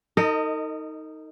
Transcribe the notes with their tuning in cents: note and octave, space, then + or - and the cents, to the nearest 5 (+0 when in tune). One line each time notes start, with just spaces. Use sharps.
D#4 +15 A#4 -45 D#5 -10